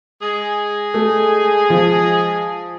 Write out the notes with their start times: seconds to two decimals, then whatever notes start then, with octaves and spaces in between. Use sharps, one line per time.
0.22 G#3 G#4
0.94 A3
1.70 F3